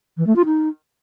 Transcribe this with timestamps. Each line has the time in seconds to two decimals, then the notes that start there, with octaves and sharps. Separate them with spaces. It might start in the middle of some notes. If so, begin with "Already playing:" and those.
0.17 E3
0.27 A3
0.36 F4
0.45 D#4